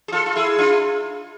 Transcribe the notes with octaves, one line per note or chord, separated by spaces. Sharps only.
G#4
F4 A4
F4
E4 G#4
D4 F4